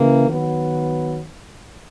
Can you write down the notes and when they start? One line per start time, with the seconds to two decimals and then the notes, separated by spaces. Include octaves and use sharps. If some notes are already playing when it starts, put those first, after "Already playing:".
Already playing: C#3 E3 A#3
0.28 D#3 F#3 B3